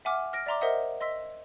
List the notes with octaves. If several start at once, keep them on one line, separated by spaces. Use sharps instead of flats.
E5 F#5 G#5 D6 F6
F6 A#6 D7
D5 E5 A#5 C6 D6
A#4 C5 D#5 E5 F#5 D#6
D#5 C6 E6 B6